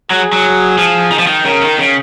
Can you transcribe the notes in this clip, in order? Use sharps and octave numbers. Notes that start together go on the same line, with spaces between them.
F#3 G#4
F#3
F3
D#3
F3
D#3
C#3 A#4
D#3
C#3